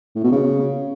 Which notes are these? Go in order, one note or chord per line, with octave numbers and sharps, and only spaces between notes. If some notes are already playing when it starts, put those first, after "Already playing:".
A2
B2
C#3